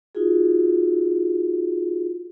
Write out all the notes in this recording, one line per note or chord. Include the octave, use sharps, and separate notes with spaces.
D#4 F4 F#4 G#4